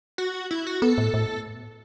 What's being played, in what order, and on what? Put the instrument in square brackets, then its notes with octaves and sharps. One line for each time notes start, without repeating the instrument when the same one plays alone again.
[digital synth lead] F#4
E4
F#4
[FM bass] B3 [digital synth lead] A4
[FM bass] A2
A2